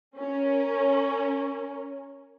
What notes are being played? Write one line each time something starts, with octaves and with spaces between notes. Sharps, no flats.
C#4 A#4